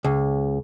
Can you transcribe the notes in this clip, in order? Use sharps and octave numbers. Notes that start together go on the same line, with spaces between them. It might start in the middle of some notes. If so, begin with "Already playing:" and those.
C#2